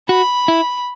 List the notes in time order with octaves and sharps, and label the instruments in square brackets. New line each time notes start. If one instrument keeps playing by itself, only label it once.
[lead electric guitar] F#4 [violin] B5
[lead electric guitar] E4